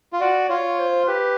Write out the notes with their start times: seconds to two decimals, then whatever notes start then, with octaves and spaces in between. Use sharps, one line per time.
0.13 F4
0.20 F#4 D5
0.50 F4 C#5
0.79 C5
1.08 G4 B4